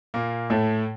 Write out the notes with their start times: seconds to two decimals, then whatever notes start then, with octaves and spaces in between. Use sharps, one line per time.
0.14 A#2 A#3
0.50 A2 A3